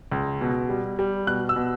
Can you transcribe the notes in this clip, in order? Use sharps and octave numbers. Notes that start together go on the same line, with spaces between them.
C#2
B2
G3
G3
B2 F#6
E6
B2